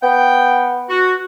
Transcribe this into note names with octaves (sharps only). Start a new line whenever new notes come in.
B3 G5
F#4